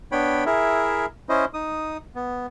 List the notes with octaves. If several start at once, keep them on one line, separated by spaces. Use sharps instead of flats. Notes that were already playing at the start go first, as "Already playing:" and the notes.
B3 D4 C#5 G5 B5
E4 G#4 A#4 E5
C#4 E4 C5 D#5
D#4 D#6
B3